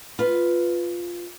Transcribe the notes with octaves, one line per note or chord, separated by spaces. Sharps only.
F4 B4